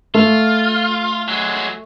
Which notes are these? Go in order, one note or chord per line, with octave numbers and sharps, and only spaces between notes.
A3 F4
F#3 G#3